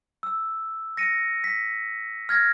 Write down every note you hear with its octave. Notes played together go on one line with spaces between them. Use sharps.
E6
A#6 C#7 D#7
B6
F6 G#6 A#6